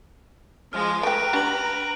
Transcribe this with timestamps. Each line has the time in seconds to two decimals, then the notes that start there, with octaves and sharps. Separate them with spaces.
0.73 F3 G#3 F6
1.03 A3 B4 G5 A#5 F#6 D7
1.33 D4 F#4 G4 F#6 F#7